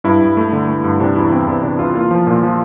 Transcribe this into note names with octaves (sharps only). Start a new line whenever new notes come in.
G2 E4
G2
A3
D3
A3
G2
C3 D4
E2 E4
E2 C4
E2 C4
C3 D4
E2 F4
A#3 F4
F3
A#2
F3